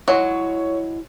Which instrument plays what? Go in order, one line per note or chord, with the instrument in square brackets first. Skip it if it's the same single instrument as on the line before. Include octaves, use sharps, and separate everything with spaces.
[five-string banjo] F#3 G#3 [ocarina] E4 [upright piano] C#5